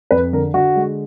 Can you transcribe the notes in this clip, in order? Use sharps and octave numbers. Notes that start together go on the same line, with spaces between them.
F2 B4
D3 A#4
D3 F#4
G#3